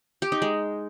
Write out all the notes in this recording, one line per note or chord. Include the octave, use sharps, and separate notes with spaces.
G4
D#4
G#3